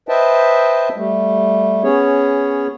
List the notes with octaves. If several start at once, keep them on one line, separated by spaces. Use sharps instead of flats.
B4 C5 D#5 E5 G5 A5
G3 A3
B3 C#4 G#4 C#5